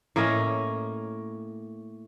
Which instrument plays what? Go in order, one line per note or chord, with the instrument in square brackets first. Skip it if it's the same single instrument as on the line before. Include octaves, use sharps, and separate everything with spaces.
[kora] A2 A#3 C#4 D#5